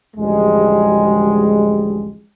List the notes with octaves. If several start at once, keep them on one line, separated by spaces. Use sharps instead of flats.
A1 D2 F3 G3 G#3